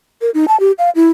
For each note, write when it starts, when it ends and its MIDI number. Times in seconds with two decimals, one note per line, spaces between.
0.21 0.30 70
0.34 0.45 63
0.48 0.59 81
0.60 0.72 67
0.78 0.90 77
0.95 1.10 64